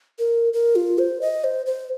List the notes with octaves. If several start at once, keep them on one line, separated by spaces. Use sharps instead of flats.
A#4
A#4
F4
C5
D#5
C5
C5